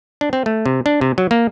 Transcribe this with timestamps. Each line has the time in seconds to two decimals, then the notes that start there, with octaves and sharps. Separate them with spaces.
0.21 D4
0.33 C4
0.46 A3
0.66 C3
0.86 D4
1.01 C3
1.18 F#3
1.31 A#3